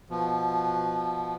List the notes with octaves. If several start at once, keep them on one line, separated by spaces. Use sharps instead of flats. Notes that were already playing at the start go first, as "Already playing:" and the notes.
B2 F3